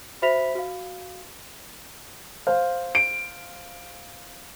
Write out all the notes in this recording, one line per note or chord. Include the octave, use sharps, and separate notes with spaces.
F#4 C5 E5 B5 B6 F7
F#4 F5
C5 F5
D7